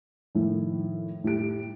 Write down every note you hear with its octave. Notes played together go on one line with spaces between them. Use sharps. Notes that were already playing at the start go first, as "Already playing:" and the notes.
F2 A2 D#3
A2 G4 D7